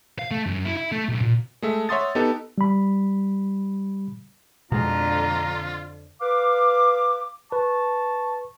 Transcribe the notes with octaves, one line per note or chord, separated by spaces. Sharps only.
F5
A3
F#2
E4
E4
A3
B1
A#2
G#3 A3 E5
C#5 E5 F#5 C6 D#6 A6
B3 D#4 G4 A4
G3 B5
F2 B2 D3 G#3 F4 A#5
B4 F5 D6
B4 A5 C#6